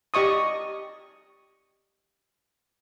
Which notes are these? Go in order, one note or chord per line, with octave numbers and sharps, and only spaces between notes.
G4 D#5 C#6 D#6